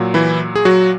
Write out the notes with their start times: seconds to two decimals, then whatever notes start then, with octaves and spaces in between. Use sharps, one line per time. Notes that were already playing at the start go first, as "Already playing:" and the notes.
Already playing: A#2 F#3
0.14 E3 E4
0.56 G#4
0.65 F#3 F#4